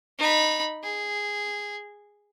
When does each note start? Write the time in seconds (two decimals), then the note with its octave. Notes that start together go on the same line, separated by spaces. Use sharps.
0.19 D#4 B5
0.83 G#4